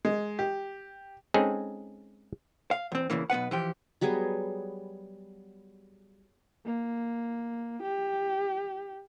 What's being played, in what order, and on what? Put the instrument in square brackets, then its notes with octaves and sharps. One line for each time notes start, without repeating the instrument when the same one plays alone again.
[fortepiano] G#3
G4
[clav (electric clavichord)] G#3 C4 C#4 D#4 G#4 A4
[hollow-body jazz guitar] F5
E2 C4
E2 C#3 E3 A#3
B1 B3 B4 F#5
E3 F3 G4
[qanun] F#3 G3 B3 G#4
[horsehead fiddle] A#3
G4